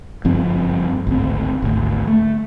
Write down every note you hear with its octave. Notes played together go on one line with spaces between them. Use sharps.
F#1 G2 F3 C4
G#1 D2 C4
G#1 D2
A3